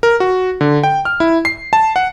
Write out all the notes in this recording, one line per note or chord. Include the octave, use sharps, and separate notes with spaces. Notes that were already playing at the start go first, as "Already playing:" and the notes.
A#4
F#4
D3
G5
F6
E4
C7
A5
F#5